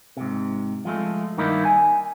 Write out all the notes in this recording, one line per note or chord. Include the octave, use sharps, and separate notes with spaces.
G#2 C3
F3 G#3 A3
G2 D#3 A#3 D#4 E4
G#5